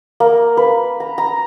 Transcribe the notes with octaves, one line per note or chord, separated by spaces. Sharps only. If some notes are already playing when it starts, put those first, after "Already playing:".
A#3
B4
A#5
A#5